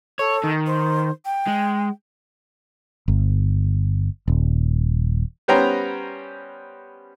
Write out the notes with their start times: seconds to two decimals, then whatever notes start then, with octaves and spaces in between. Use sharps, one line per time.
0.19 A4 C#5
0.44 D#3
0.66 C5
1.25 G5
1.48 G#3
3.08 G1
4.28 D#1
5.48 G3 B3 C#4 C5 G5 A#5